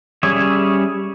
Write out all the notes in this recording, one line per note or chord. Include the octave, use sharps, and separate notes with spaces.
G3 C#4 G#4 C#5 E5